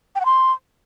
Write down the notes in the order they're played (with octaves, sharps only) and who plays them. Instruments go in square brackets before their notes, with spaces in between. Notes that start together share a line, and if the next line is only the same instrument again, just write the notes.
[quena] G5
F#5
C6